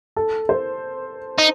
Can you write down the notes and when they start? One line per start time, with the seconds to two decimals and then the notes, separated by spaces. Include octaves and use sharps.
0.16 A4
0.49 C5
1.39 D#4